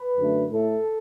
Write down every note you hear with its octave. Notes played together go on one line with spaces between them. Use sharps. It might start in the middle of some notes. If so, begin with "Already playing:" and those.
Already playing: B4
F#2 D3 A3
A2 A3 A4